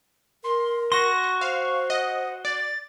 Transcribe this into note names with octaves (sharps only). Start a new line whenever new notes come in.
A#4 C6
F#4 C6 C#6 A#6
C#6
C5 F5
D#5 F#5
D5 A6